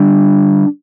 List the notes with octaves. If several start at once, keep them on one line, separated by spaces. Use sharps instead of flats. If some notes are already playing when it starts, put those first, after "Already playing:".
Already playing: D3 G3 D4